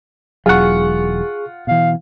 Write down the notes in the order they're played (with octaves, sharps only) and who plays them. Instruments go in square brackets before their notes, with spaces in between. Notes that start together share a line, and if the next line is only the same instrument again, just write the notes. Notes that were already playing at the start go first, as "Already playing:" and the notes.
[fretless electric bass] E1 F#3 [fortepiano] F4 F#5 [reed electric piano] G#4 C#6
[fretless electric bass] B2 E3 [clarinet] F5